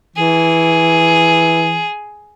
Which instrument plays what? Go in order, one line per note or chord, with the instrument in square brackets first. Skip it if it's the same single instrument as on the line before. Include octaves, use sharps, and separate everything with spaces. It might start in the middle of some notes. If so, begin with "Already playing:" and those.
[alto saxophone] E3 [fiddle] G#4